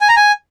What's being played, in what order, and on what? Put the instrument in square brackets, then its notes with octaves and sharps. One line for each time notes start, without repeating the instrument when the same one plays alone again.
[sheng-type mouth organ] G#5
A#5
G#5